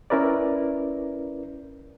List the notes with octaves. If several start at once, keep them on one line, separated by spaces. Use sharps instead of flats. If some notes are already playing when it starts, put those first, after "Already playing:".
C#4 E4 A#4 B4 D5